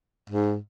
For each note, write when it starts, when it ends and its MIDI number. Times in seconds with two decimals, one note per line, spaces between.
0.30 0.57 44